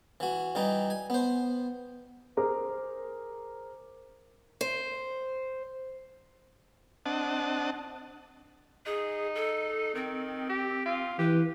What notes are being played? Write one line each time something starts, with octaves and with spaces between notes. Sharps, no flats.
E3 F#4
E3 G3 D#4
G#5
B3 C5
G#4 A#4 C5 A#5 D6
C5
C4 D4 D#5 F#5 A5
D#4 G#4
A4
D#3 C4
G4
F4
E3 G4 B4